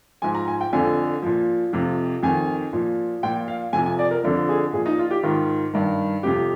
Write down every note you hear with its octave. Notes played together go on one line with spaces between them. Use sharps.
G#2 F3 G#5
A#5
G#5
G5
F2 D3 F3 G#5
A#2 F3
F2 C3 F3
F2 D#3 G#5
A#2 F3
A#2 F3 G5
F5
F2 C3 F3 G#5
G#5
D5
A#4
F2 D3 F3
G#4
A#2 F3 G#4
D#4
F4
G4
G#2 D#3 F4
G2 D#3
F2 C3 F3 G4